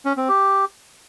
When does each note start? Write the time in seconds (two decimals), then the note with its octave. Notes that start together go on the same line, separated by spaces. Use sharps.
0.05 C#4
0.17 C4
0.29 G4